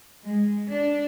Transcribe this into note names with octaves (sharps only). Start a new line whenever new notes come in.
G#3
D4